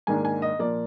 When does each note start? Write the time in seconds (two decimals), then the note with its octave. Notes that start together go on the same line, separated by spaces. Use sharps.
0.07 G#2 D#3 A#3 D4 G#5
0.25 G#5
0.42 D#5
0.59 A#2 F3 A#3 D5